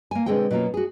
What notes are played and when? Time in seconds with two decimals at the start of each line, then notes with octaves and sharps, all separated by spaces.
0.11 A#3 G#5
0.26 B2 D3 G#3 C4 G#4 G5
0.51 B2 F#3 G3 A#3 C#4 F4
0.74 F#4 G#4